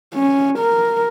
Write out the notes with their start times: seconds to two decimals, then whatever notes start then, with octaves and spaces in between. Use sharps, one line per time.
0.14 C#4
0.58 A#4